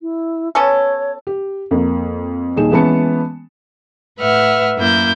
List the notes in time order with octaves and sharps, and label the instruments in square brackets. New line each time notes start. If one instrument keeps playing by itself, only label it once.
[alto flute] E4
[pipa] B3 C#4 A4 [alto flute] C#5
[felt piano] G4
F2 A#3
D#1 D#4 G#4 E7
E3 G#3 B3 C#4 A5 C#7
[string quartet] A2 B4 E5 F#5 F6
F#2 A#3 E4 G6